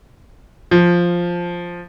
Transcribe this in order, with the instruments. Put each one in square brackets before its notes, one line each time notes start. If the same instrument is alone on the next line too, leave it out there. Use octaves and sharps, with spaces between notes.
[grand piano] F3